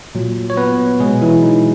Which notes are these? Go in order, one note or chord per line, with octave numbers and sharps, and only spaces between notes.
A#2 F#3
C#5
B3 B4
B2 F#3 G#3 G#4
E3 E4
D#4